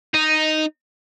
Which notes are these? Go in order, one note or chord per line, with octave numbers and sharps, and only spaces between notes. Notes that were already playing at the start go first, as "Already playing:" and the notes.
D#4